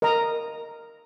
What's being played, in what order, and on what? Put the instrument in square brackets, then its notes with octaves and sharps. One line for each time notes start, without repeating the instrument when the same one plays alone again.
[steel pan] A#4 D#5 A#5